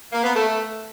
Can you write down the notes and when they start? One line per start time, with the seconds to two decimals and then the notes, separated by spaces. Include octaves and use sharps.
0.13 A#3
0.23 B3
0.34 A3